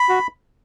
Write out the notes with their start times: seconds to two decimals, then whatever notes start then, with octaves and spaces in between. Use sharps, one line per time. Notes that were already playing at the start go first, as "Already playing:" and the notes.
Already playing: B5
0.09 F#4